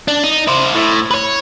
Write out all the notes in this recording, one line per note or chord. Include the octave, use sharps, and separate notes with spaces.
D4
D#4
E4 C5
A2
B4 C#5